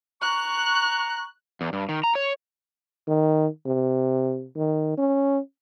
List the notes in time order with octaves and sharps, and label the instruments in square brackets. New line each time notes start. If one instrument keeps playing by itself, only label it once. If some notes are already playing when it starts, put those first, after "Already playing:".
[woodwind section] A#5 C#6 [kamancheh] F#6
[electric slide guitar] E2
G2
D#3
A#5
C#5
[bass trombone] D#3
C3
D#3
C#4